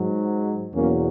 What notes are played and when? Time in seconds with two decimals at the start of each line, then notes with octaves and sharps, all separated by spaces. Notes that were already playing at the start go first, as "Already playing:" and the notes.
Already playing: G#2 F#3
0.74 E2 B2 F#3 A#3 C#4